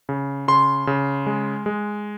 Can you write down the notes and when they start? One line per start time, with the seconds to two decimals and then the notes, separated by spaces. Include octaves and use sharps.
0.09 C#3
0.48 C#3 C6
0.87 C#3
1.27 G#3
1.66 G#3